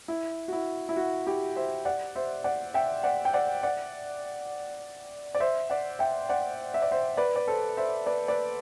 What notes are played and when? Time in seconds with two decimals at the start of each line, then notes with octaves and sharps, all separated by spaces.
0.08 E4
0.48 F#4
0.53 E4
0.89 E4
0.97 F#4
1.26 E4 G4
1.56 C5 E5
1.85 D5 F#5
2.15 C5 E5
2.44 D5 F#5
2.74 E5 G5
3.03 D5 F#5
3.25 G5
3.33 D5 F#5
3.63 D5 F#5
5.35 D5
5.40 C5 E5
5.70 D5 F#5
5.99 E5 G5
6.29 D5 F#5
6.74 E5
6.82 D5
6.91 C5 E5
7.17 B4 D5
7.36 D5
7.47 A4 C5
7.77 C5 E5
8.06 B4 D5
8.28 B4 D5